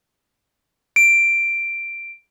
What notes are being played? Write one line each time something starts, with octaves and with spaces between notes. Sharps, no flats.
D7